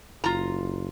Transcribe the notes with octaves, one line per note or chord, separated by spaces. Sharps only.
F#1 F4 A#5